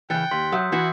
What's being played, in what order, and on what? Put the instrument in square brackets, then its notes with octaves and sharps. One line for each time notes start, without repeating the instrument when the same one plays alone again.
[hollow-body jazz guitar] C#3 E3 [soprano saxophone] G5 [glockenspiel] F#6 A6 C#7
[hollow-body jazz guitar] D#2 [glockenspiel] C6 B6
[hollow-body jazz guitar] F#3 E5 [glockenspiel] D#6 E6 G6
[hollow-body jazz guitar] E3 E4 E5 [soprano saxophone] F#4 [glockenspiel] C7